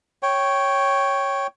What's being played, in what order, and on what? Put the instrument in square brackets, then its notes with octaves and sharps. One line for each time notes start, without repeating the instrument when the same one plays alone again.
[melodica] C#5 G5